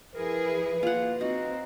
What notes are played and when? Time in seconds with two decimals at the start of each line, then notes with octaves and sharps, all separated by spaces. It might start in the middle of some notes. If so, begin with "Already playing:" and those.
0.15 F3 E4 G#4 A#4 B4
0.83 A#3 F4 F#5
1.21 C4 D#4 F#4